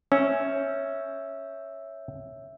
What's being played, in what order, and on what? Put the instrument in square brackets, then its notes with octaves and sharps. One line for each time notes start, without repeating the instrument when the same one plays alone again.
[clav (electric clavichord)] C#4 [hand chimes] C#5 E5 E6